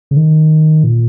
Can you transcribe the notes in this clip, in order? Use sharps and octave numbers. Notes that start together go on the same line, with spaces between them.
C#3
D#3
A#2